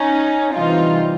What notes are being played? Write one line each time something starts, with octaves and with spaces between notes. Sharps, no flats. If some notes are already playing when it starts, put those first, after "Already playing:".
Already playing: C#4 D#4
C3 E3 G3 C4 D#4 F4